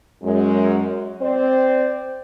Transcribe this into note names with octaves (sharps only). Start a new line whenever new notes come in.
F#2 G#3
C4 C5 D5